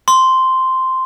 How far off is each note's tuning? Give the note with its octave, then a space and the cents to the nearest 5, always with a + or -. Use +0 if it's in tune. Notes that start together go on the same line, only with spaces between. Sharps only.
C6 -5